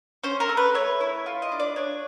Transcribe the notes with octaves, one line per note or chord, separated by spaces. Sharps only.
C#4 C5
A#4
A3
B4
A3 C#5
E4
F4
D#5
D4
D5
D4 C#5